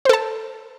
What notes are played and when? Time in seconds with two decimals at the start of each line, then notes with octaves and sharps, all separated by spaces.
0.05 C5
0.09 A4
0.13 A5